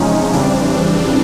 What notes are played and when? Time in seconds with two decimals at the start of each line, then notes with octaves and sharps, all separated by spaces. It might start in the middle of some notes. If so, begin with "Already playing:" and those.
Already playing: E2 C3 F3 G#3 C#4 D#4
0.33 F2 C#3 E3 G3 C4 D4